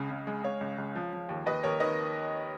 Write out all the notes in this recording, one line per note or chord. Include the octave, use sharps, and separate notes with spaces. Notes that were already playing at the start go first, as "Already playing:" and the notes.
Already playing: C#2 C#3
C#3
G#3
G#3 C#5 F5
C#2
C#2
F3
F3
D#2
D#2 B4 D#5
D#2 A#4 C#5
D#3 B4 D#5